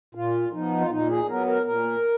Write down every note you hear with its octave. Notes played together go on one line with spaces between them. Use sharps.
A#2 F4
F3 B3 D#4
F4
A#2 D#4
G#4
F#3 B3 A#4
A#4
A#2 A#4